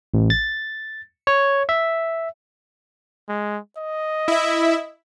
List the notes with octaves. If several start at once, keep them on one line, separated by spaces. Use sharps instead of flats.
A1
A6
C#5
E5
G#3
D#5
E4 E5